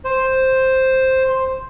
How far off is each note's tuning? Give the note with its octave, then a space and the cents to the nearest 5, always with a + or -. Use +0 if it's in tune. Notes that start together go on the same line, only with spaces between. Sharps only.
C5 +5